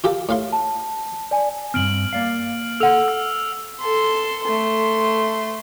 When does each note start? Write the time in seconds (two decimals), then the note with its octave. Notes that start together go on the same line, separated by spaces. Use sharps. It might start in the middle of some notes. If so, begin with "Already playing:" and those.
0.04 F4 G4 A4
0.29 A2 F5 C6
0.52 A5
1.31 D5 G#5
1.74 G2 A#2 C4 F6 D7 F#7
2.13 A#3 D5 F5
2.80 A4 F#5 E6 F6 F7
3.08 E6
3.81 A4 C6
4.44 A3 C6